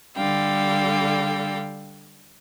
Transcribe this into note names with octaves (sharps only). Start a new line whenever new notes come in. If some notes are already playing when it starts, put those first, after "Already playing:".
D3 G3 A4 F5 G5